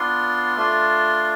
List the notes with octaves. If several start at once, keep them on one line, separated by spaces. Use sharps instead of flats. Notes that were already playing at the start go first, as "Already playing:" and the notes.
Already playing: B3 D4 F4 C6
A3 D4 F4